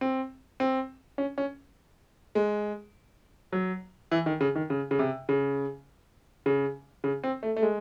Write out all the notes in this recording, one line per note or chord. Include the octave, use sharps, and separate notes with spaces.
C4
C4
C#4
C#4
G#3
F#3
E3
D#3
C#3
D#3
C#3
C#3
C3
C#3
C#3
C#3
C4
A3
A3
G#3